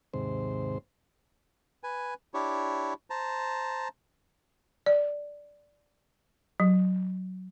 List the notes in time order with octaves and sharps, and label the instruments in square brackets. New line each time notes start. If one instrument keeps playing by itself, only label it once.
[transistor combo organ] D#2 G#2 C3 C5
[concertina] B4 G#5
D4 E4 G4 C#5
C5 A5 A#5
[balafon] D5
F#3